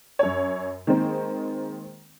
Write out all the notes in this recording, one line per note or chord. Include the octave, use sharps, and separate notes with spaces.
F#2 C#5
D#3 G#3 A#3 C4